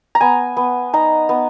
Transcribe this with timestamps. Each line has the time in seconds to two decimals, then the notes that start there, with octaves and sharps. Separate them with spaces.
0.15 A#5
0.20 B3 G#5
0.57 B3
0.94 D#4 A#5
1.29 B3